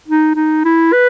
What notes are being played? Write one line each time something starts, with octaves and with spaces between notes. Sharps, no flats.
D#4
D#4
E4
B4